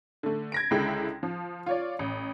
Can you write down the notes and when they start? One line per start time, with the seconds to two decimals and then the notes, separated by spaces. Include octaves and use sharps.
0.23 D3 A3
0.52 G#6 A#6 D7
0.71 C#2 D3 G#3 E4 G5
1.23 F3
1.66 F4 C#5 D5
1.99 A1